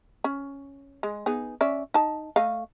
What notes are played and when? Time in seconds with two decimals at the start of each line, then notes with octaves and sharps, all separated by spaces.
0.24 C#4
1.03 G#3
1.26 B3 D#4 G#4
1.61 C#4 D5 E5
1.94 D#4 A5
2.36 A3 D#5 F5